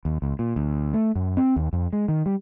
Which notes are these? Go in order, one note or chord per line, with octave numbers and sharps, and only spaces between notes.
D#2
C#2
A#2
D2
A3
F#2
C4
D#2
F2
G#3
D#3
G3